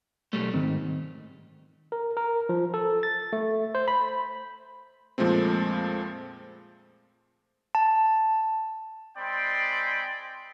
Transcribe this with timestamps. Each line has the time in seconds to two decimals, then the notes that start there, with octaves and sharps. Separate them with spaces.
0.33 B1 G3 A3
0.54 G#2 D#3 C4
1.92 A#4
2.17 A#4
2.49 F3
2.74 A4
3.03 A6
3.33 A3
3.75 C5
3.88 B5
5.18 F2 A#2 F3 G#3 A3 C4
7.75 A5
9.17 G#3 C4 D5 G5 B5 C6